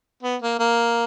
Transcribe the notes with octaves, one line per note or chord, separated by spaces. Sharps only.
B3
A#3
A#3